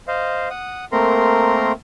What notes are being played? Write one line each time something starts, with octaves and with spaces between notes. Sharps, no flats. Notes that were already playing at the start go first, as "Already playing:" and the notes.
C5 D#5 F5
F#5 D#6
A3 A#3 C4 A#4 A#5 C6